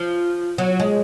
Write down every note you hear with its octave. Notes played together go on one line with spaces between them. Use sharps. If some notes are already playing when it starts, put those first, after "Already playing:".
Already playing: F3
F#3
G#3